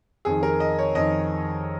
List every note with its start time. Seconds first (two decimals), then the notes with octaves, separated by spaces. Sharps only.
0.25 F2 D#3 G#4
0.43 A#4
0.60 D#5
0.78 C#5
0.95 F2 D#3 D#5